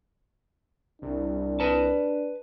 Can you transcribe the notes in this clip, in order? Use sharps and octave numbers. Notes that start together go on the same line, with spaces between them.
C2 D4
B4 A5